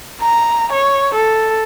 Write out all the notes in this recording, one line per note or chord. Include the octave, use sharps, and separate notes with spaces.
A#5
C#5
A4